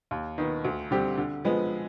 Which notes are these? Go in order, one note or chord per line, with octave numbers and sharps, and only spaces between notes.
D#2
D#3 B3
D2
D3 G3 C4 G4
D3
F3 G#3 B3